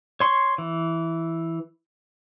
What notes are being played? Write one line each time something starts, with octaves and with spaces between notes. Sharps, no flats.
C#5 C6 C#6
E3